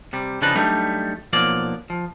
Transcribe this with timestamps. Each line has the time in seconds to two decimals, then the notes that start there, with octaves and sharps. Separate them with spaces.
0.13 C3 G3
0.42 C#3 F3 D4 D#4 B4
0.55 F#3 G3 A3 D4 D#4
1.33 B1 F3 F#3 A#3 D5
1.90 F3